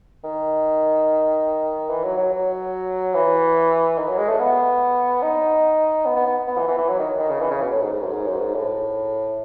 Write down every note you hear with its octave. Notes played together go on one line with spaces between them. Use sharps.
D#3
E3
F#3
F#3
F#3
E3
D#3
F#3
G#3
A3
B3
D#4
B3
B3
B3
B3
E3
E3
E3
F#3
D#3
D#3
C#3
E3
C#3
B2
A2
G#2
G#2
F#2
G#2
F#2
G#2
A2